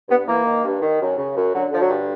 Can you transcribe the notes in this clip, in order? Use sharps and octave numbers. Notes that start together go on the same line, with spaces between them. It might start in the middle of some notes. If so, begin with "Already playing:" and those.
G2 B3
E3 A#3
D#3
G2
D#3
F#2
C#3
F#2
D3 F#3
D3 F3
F#3
G2